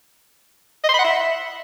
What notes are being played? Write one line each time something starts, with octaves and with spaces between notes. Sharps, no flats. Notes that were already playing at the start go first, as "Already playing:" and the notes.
D#5
C6
B5
F#5
E5